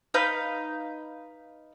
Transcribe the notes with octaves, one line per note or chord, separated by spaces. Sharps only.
D#4 B4 F5 G6